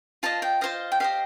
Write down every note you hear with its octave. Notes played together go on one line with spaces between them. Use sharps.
F4 C5 D#5 A5
G5
F4 C5 D#5 F5
G5
G4 C5 D#5 F5